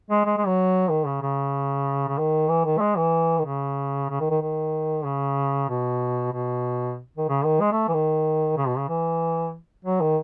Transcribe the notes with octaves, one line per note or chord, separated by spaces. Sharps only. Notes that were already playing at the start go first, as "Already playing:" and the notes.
G#3
G#3
G#3
F#3
D#3
C#3
C#3
C#3
D#3
E3
D#3
A3
G#3
E3
D#3
C#3
C#3
D#3
D#3
D#3
C#3
B2
B2
D#3
C#3
D#3
G#3
A3
E3
D#3
C#3
B2
C#3
E3
F#3
D#3